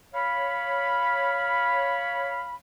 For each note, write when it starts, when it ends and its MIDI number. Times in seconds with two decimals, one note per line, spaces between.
0.14 2.55 73
0.14 2.55 77
0.14 2.55 83